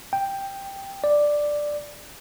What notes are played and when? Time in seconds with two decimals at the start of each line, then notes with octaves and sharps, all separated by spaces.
0.13 G5
1.04 D5